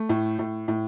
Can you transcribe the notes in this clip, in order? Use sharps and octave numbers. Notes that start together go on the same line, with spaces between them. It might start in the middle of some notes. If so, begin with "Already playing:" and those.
Already playing: A3
A2
A2
A2